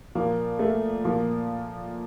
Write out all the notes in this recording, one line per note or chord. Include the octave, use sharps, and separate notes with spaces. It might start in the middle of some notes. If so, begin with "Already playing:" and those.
A#2 F3 A#3
A3
A#2 F3 A#3